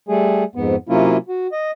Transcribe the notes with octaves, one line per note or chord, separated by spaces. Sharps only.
G3 A3 G#4
F2 G#2 B3
C3 F#3 A#3 C#4 E4 F4
F#4
D#5